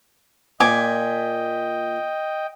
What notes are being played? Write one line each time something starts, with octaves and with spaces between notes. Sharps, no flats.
A#2 D#5 G5 G#5 D6